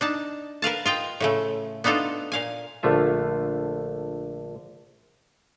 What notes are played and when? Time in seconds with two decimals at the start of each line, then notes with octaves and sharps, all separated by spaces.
0.01 D4 D#4 A5
0.62 A#4 B4 F5 A5
0.86 F4 D#5 G5
1.20 A2 C#3 A3
1.84 B3 D4 D#4 F4 A4
2.32 A#2 F5 G#5
2.83 A#1 D3 A3 F4 E5